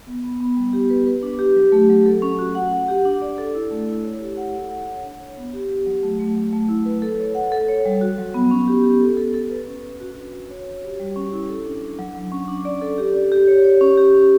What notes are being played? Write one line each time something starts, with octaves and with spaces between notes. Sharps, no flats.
B3
B3
B3
G3
G4
B4
B4
D4
G4
F#3
A3
F#3
A4
C#4
F#4
F#5
F#5
G4
D4
D5
A4
E4
A3
E4
C#5
G4
F#5
A4
F#5
C#5
D4
C#5
B3
G4
G4
F#3
A3
A3
F#3
A3
E4
B4
A4
C#5
F#5
A4
C#5
G3
F#4
F#3
B3
C#4
G4
G4
A4
A4
A4
B4
C#4
B4
F#4
D4
F#4
C#5
C#5
G4
G3
C#4
E4
A4
D4
D4
F#3
F#3
C#4
D4
D5
A4
G4
D5
G4
C#5
C#5
C#4
G4
C#4